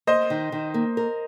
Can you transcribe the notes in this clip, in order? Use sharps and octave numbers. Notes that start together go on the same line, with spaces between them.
A#3 C5 D#5
D#3
D#3
A#3
A#4